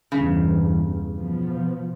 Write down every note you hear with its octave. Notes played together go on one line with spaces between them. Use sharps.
E2 G2 C#3
B2 F3 B3